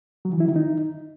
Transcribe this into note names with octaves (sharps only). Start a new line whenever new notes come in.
F#3
E3
E4
D#3
D#4